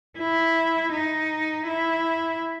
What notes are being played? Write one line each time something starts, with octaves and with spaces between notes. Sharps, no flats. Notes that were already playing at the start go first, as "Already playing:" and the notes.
E4
D#4
E4